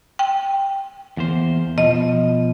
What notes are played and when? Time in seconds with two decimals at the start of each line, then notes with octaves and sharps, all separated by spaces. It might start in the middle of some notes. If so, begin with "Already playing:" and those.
0.19 G5
1.17 E2 A#3 C5
1.78 B2 F3 D#5